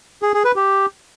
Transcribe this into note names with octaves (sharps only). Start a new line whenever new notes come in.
G#4
G#4
B4
G4